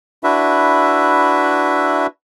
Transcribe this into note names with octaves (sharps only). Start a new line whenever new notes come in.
D4 E4 F#4 B4 E5